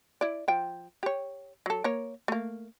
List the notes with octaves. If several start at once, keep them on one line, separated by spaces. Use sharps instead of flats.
E4 D5
F3 G5
G4 C#5
F#3 A4
A#3 A#4 C#5
A3 A#3